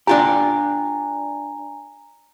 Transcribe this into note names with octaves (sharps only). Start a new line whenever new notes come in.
D4 F4 G4 G#5 A#5